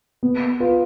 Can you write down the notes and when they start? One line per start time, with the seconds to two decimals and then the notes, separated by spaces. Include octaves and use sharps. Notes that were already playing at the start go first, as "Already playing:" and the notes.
0.23 B3
0.60 F4 B4